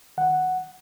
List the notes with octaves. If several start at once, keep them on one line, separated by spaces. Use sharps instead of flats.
D#3 F#5